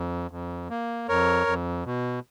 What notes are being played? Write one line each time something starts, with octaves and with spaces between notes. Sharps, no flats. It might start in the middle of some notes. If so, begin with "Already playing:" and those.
Already playing: F2
F2
A#3
F2 A#4 C#5
F2
B2